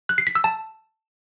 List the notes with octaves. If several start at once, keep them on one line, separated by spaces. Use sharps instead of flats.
F#6
C7
B6
E6
A5